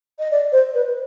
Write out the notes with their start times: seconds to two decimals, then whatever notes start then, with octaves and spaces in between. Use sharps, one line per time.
0.19 D#5
0.31 D5
0.52 C5
0.74 B4